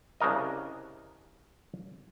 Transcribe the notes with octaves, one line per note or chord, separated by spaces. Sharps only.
C2 C#3 D4 A#4 D#5